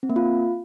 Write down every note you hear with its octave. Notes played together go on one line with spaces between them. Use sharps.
C4
A#3
F4